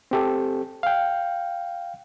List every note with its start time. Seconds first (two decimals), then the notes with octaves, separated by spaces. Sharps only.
0.11 C4 G4 A4
0.83 F5 G5